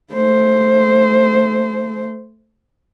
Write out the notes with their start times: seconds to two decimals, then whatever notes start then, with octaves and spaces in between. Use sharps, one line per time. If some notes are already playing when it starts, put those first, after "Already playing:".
0.14 A3 C5